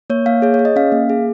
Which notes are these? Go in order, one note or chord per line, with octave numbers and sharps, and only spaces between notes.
A#3 C#5
A#3 F5
G#4 C#5
C#5
G#4
D#5
C#4 F5
A#3
G#4